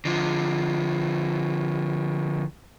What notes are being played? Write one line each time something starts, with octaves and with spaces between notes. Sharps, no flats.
D3 F3